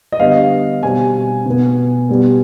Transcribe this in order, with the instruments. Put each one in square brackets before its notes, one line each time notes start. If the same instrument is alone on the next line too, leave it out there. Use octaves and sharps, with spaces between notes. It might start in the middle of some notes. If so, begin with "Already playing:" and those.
[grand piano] D#5
D3 G3 B3 F5
B2 G3 C4 G#5
B2 B3
B2 G3 B3